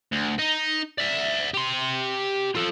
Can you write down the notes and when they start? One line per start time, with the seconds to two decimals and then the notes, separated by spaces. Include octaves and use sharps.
0.12 D2
0.39 D#4
0.98 D5 E5
1.54 G4 C6
2.55 F4 A4